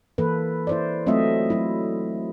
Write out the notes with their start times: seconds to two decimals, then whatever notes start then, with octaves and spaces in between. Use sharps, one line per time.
0.18 E3 A#3 A4 B4
0.67 E4 C5 D5
1.06 F#3 A3 C4 F4 D#5 E5
1.50 F#3 E4